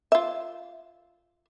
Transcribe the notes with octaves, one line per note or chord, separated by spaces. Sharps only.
F4 E5